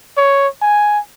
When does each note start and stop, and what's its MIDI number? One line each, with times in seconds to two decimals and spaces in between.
0.17 0.47 73
0.62 0.99 80